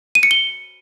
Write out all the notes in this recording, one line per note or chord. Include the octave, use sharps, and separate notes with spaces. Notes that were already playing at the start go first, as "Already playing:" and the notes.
D#7
C#7
G7